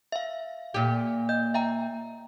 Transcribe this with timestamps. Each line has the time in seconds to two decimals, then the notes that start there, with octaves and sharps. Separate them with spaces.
0.12 E5 F5
0.74 A#2 G4
1.29 D#5 G6
1.54 E5 G5 A#5